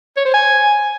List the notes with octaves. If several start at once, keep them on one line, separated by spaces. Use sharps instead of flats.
C#5
C5
G#5